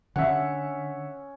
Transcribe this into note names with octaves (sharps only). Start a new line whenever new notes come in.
D3 C#4 C#5 E5 F#5